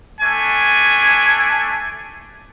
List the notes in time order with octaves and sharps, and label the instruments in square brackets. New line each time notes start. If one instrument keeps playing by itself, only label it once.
[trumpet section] A3 D4 G#5